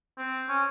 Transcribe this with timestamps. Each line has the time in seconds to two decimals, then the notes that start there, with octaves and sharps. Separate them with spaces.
0.18 C4
0.49 C#4